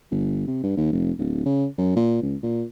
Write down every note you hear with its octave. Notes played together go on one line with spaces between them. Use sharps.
G1
C3
G2
D#2
F1
D1
C#3
F#2
A#2
C#2
A#2